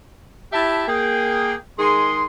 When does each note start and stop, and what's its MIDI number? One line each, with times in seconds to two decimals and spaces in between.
0.53 0.85 64
0.53 0.85 67
0.53 0.85 76
0.53 0.85 81
0.88 1.54 58
0.88 1.54 68
0.88 1.54 79
1.79 2.24 51
1.79 2.24 56
1.79 2.24 68
1.79 2.24 84